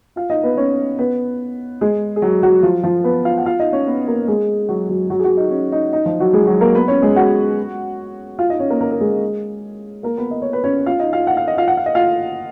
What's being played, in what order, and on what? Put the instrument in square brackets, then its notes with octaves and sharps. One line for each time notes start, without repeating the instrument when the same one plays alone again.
[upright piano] F4 F5
D#4 D#5
B3 B4
C#4 C#5
B3 B4
G#3 G#4
G#4
F#3 F#4
F#3 F#4
F3 F4
F3 F4
B3 B4
F4 F5
F#5
F4 F5
D#4 D#5
C#4 C#5
B3 B4
A#3 A#4
G#3 G#4
F#3 F#4
F#3 F#4
F#3 F#4
G#4
F#3 F#4
D#4
C#4
D#4
D#4
F3 F4
F#3 F#4
G#3 G#4
F#3 F#4
A#3 A#4
B3 B4
C#4 C#5
G#3 G#4
F#4 F#5
F4 F5
D#4 D#5
C#4 C#5
A#3 A#4
A#3 A#4
A#4
G#3 G#4
A#3 A#4
B3 B4
D#5
C#5
B4
C#4 C#5
F4 F5
D#4 D#5
F4 F5
F#5
F5
D#5
F4 F5
F#5
F5
D#5
F4 F5